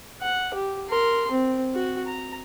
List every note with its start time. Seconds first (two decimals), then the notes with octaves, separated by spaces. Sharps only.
0.22 F#5
0.54 G4
0.89 A#4 C6
1.31 C4
1.74 F#4
2.06 A#5